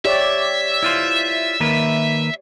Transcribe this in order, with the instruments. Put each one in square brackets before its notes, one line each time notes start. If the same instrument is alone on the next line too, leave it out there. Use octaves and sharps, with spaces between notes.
[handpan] G4 C#5 D5 [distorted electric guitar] E5
[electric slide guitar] E4 F4 C5
D#3 A#3 B4